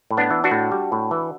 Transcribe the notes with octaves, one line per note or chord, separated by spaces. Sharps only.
A2
B3 D4
E3
D4 F#4
A2
G3
A2
E3